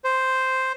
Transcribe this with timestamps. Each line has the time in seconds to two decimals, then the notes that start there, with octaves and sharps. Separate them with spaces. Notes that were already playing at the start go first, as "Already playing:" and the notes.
0.04 C5